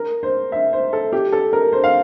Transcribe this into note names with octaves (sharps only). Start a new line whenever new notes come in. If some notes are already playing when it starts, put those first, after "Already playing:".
Already playing: A#4
C5
E5
C5
A4
G4
A4
A#4
C5
F5